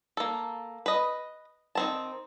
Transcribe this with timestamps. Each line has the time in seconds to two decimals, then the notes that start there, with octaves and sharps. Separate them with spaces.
0.17 A#3 A4
0.86 B4 D#5
1.75 D#3 C4 A5